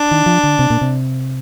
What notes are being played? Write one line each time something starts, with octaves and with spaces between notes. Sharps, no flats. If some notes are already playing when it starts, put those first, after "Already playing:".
Already playing: D4
D#3
F3
D3
C3
A#2
C3